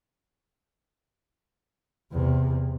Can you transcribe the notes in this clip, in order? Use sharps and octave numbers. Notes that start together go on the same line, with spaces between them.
E2 C3